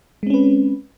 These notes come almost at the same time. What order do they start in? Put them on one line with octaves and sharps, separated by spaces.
G#3 C4 C#4 B4